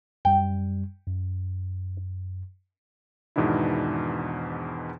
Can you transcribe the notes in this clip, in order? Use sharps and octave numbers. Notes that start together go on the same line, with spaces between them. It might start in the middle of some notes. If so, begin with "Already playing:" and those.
F#2 G3 G5
F#2
E2 G#2 B2 D#3 D4 E4